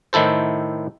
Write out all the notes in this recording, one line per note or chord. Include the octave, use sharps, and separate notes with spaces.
A2 D#3 E4 A4 C5